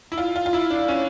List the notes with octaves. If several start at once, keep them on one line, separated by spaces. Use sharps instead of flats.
E4
F4
F4
F4
E4
D4
C#4